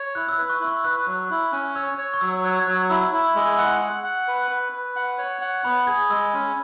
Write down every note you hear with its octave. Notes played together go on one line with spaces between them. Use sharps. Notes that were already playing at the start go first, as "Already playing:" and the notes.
Already playing: C#5
E4 F#6
E6
F#6
B4
C#6
E4
C#6
B4 F#6
F#3 F#6
E4 F#6
C#4 F#6
C#5 E6
C#5
C#6
F#3 E6
C#5 F#6
G#6
F#3 F#6
E4 E6
E4
G#3
F#5
F#5
F#5
B4
B4
B4
F#5
C#5
F#5
B3 B5
G#4 G#6
G#3 E6
C#4